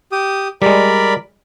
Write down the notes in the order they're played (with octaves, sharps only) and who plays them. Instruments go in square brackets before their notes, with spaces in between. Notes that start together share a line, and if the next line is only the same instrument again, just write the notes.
[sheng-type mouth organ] G4 D#6
[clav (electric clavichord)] G3 G#3 [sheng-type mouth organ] A#4 D5 B5